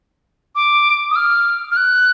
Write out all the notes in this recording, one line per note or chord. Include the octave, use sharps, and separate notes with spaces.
D6
D#6
F6
F6
F#6